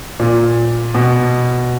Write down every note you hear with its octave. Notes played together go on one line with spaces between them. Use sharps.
A#2
B2